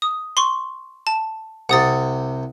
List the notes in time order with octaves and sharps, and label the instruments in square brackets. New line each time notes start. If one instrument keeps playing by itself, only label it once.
[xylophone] D#6
C6 C#6
A5
[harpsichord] C2 C3 [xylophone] F#5 D#6 A6